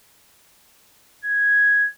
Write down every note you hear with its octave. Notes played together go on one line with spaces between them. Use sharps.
G#6